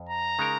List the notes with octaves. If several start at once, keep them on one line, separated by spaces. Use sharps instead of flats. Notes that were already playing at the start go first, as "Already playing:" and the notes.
Already playing: F2
A#5
C#3 G#3 D#4 A#4